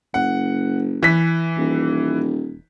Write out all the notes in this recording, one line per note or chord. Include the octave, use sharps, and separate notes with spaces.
F#1 F#5
E3 B6
D#1